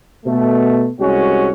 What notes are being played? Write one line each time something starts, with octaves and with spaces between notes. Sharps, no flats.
B2 A3
C2 G#3 C#4 F#4